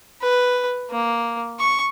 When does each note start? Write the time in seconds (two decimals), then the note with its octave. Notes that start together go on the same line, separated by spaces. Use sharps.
0.21 B4
0.91 A#3
1.60 C#6